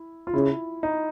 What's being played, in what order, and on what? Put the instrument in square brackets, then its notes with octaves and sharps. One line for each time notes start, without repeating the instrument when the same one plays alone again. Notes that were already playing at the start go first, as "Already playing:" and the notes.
Already playing: [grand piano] E4
F4
[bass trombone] C#3 [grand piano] E4
[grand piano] D#4